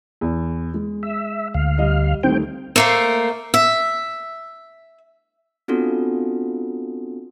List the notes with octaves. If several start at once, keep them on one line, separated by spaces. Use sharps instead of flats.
E2
G#3
E5
D2 F5
G3 D#5
D#3 G3 A3 C4 G5
A3 A#3 C5
E5
B3 C4 D4 F4 F#4 A4